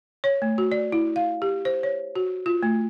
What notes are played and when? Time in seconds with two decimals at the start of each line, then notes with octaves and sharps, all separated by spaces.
0.24 C#5
0.42 A3
0.58 F#4
0.72 D5
0.92 E4
1.16 F5
1.42 G4
1.65 C5
1.83 C#5
2.16 F#4
2.46 F4
2.63 A3